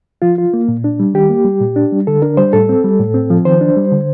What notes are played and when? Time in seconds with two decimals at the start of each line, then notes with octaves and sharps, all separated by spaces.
0.22 F3 F4
0.38 F4
0.54 A#3
0.68 A#2
0.84 D4
1.00 G3
1.14 D#3 G4
1.29 A#3
1.45 G3
1.61 A#2
1.76 D4
1.92 G3
2.07 D3 A4
2.22 D4 A#4
2.37 G3 C5
2.53 A2 A4
2.69 C4
2.84 G3
3.00 A2
3.14 C4
3.30 F3
3.45 D#3 C5
3.61 D4
3.77 G3
3.91 D3